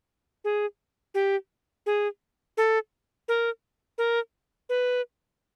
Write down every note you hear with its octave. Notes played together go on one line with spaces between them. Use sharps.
G#4
G4
G#4
A4
A#4
A#4
B4